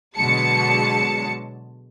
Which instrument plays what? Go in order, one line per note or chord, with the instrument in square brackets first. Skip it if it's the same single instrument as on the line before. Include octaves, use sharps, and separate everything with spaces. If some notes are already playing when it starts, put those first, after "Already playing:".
[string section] B2 D3 F#3 G#3 A5 C#7